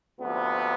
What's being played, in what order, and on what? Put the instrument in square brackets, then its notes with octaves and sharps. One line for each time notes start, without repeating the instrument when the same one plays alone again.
[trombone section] D2 C3 F3 B3